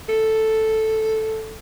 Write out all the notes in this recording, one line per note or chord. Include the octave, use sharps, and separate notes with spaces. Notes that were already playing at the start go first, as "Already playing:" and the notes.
A4